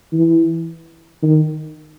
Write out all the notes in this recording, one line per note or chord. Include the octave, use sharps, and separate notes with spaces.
E3
D#3